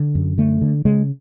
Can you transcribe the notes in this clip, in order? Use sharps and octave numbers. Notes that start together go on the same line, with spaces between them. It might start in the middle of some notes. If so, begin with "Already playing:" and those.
Already playing: D3
F#2
D3 A3
D3
C#3 G#3